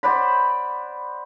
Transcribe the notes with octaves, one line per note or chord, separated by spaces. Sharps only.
C5 D5 F#5 B5